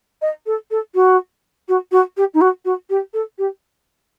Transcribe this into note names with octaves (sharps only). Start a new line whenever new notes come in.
D#5
A4
A4
F#4
F#4
F#4
G4
D#4
F#4
F#4
G4
A4
G4